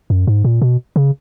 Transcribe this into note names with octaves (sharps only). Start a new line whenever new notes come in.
F#2
G#2
A#2
B2
C#3